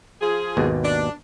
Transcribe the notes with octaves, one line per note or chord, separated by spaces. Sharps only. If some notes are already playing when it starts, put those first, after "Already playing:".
F3 F4 G#4
G#1 D#2 B2
D4